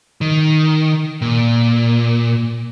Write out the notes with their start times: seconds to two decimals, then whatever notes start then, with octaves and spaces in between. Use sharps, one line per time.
0.21 D#3
1.22 A#2